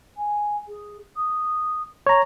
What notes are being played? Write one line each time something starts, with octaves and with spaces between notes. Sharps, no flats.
G#5
G#4
D#6
C#5 A#5